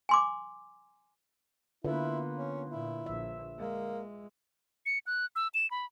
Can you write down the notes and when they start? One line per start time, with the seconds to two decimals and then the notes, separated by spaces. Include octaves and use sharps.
0.09 G#5 C6 D6
1.84 D3 A#3 B3 E4 F4 B4
2.36 C#4
2.69 A#2 E4
3.06 A#1 E5
3.58 G#3 A#3
4.86 C#7
5.07 F#6
5.36 E6
5.54 E7
5.71 B5